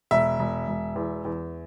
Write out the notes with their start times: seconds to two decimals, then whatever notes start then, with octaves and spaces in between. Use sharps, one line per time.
0.11 E1 E5
0.39 E1
0.67 E1
0.96 E2
1.25 E2